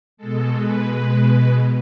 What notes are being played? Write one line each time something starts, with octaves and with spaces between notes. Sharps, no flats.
B2 G#3 A4
B4